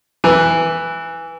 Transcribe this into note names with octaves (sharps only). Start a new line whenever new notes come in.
E3